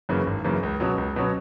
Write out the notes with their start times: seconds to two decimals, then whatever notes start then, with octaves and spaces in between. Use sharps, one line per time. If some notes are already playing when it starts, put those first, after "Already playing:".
0.09 F#2 C#3 E3 A#3
0.27 G#1
0.44 F#2 C#3 E3 A#3
0.63 C#2
0.80 B2 F#3 C#4
0.98 C#2
1.16 B2 F#3 C#4